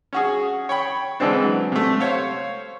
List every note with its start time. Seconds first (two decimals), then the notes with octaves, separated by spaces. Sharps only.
0.13 C#4 F#4 G#4
0.69 C#5 G5 B5
1.20 D3 E3 G#3 C4 D4
1.44 F#3
1.72 C3 A3
2.00 C5 C#5 F5